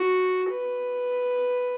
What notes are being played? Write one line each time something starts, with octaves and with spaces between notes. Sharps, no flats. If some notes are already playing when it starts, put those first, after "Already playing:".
Already playing: F#4
B4